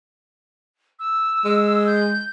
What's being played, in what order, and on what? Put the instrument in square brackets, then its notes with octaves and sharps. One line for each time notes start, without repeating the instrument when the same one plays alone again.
[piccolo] E6
[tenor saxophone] G#3
[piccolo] G6